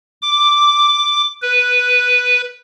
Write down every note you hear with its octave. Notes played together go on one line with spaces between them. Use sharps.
D6
B4